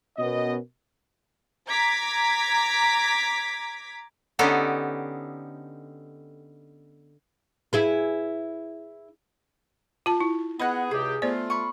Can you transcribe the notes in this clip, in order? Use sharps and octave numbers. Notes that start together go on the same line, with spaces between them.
B2 B3 C#4 A#4 D#5
A#5 D6 G#6 B6
D3 B3 C#4 D#4 G4 A4
E4 G#4 B4
F4 A5
E4
B3 G#4 D#5 F#5 B5 F#6
C#2 C3 G4 G#4
A3 B3 F4 C5 D5
B5 C#6